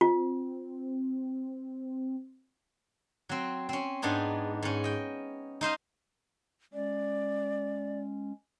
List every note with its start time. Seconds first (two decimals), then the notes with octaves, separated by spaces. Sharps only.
0.01 C4 F4
3.29 F#3 C4
3.69 C4 C#4
4.02 G#2 B3 D4 D#4 G#4
4.62 G#2 C#4
4.84 D#5 G5
5.61 D#4 C5 D#5 F5
6.73 G#3 C#4 D5